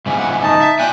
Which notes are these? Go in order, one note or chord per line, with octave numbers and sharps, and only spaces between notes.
G#2 C#3 E3
F#5
D#4 A5
E5
A#3 D5 G5 G#5 F#6